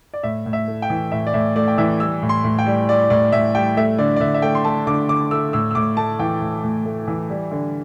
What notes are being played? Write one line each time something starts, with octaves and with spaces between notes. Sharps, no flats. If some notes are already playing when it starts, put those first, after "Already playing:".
D5
A2 E5
A2
E5
A3
G5
E3
A2 E5
D5
A2 E5
A3 D5
G5
E3 E5
G3 E6
A2
C6
A2
G5
G3
G3 D5
A2 D5
A2 E5
G3 G5
A3 E5
D3 D5
D5
D3 E5
E5
A3 G5
C6
A3 A5
D3 D6
D3 D6
A3 E6
A2 E6
E6
A2 D6
A3 A5
E3 G5
A2
A2
A3
E3
G3
D3